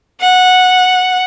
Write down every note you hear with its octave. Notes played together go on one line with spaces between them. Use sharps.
F#5